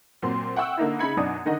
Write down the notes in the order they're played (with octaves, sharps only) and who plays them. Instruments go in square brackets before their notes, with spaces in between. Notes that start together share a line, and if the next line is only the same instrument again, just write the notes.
[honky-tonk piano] A#2 F#3 C4 C6
E5 F#5 G5 C#6 E6
D3 A#3 D#4 E4
C#3 D#4 E5 B5 G#6 C#7
F#2 B2 D4 D#4 D#6
D3 D#3 D#4 D#5 F#5